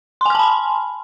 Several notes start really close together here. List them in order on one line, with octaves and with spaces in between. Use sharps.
C6 G#5 F6 A5 B5